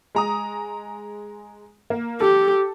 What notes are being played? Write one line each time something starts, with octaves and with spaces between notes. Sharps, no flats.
G#3 A#5 D#6
A#3
G4 A4